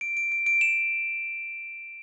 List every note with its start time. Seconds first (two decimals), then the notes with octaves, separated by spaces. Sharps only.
0.01 D7
0.17 D7
0.32 D7
0.46 D7
0.61 E7